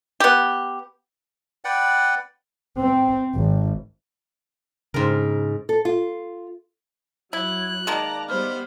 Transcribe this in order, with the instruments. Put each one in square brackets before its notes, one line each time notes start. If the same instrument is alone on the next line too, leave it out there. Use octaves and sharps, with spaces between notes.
[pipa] B3 G4
[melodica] B4 D5 F#5 G5
[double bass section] C4
G#1
[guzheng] G#2 A#4 [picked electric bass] C#3
[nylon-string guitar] A4
F4
[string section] F#3 [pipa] E4 [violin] F#6 [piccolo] G#6
[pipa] D#3 G#3 A#3 [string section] D5 A#5 [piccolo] A5
[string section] G3 B3 [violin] C5 B5 [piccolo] F6